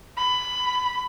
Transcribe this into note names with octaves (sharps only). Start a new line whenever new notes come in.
B5